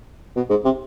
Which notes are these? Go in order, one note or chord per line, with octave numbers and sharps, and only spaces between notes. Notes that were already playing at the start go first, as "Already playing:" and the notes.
B2
G#2
C3